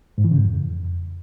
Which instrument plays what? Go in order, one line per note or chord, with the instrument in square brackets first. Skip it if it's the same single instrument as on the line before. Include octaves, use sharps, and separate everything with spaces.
[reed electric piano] G#2
E3
C#3
G#2
F2